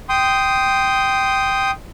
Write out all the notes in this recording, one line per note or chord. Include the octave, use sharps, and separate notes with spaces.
G5 C6 D#6